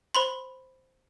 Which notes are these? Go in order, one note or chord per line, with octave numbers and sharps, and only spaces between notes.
C5 B5 C6